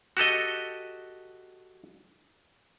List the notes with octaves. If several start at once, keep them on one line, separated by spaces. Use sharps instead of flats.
F#4 G4 A4 D#5